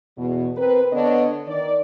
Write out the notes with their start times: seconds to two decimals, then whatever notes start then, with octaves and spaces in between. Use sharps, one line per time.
0.17 E2 B2
0.57 C4 A#4 B4
0.93 D3 B3 D4 C#5 D#5
1.48 D#3 D5